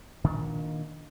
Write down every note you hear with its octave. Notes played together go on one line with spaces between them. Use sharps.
A#2 D#3 D4